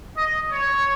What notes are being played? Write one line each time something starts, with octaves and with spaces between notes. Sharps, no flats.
D#5
C#5